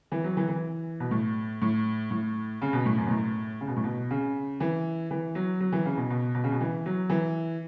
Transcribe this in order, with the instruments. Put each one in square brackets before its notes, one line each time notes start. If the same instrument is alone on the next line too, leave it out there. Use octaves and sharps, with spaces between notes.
[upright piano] E3
F#3
E3
E3
B2
A2
A2
A2
C#3
B2
A2
F#2
B2
A2
C#3
B2
A2
B2
C#3
E3
E3
F#3
F#3
E3
C#3
B2
B2
B2
C#3
B2
E3
F#3
E3